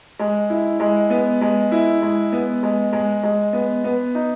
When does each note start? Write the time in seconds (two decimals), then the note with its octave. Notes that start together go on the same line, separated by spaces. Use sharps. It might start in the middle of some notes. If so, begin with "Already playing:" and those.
0.19 G#3
0.50 E4
0.80 G#3
1.10 B3
1.41 G#3
1.71 E4
2.02 G#3
2.33 B3
2.63 G#3
2.93 G#3
3.23 G#3
3.53 B3
3.84 B3
4.15 D#4